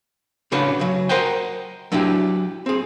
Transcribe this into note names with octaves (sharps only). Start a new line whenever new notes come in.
A2 C#3 C#4 D4 F#4 B4
C#3 F#3
A#4 C5 D#5 F#5 G5
F#3 D4 E4 G4
C4 G#4